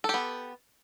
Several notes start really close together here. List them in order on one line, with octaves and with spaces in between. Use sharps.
A4 G4 B3